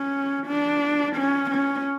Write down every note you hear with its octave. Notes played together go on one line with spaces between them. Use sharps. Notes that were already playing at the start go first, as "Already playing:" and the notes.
Already playing: C#4
D4
C#4
C#4